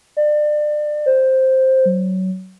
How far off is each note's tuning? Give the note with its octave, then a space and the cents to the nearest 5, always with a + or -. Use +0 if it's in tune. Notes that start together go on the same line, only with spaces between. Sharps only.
D5 +30
C5 +5
F#3 +20